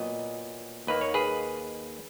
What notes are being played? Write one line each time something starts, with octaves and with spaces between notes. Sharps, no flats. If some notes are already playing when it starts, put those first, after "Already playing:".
Already playing: A#2 F#3 B3 D#5
D#2 D#3 A#3 B4
C#5
G#4 B4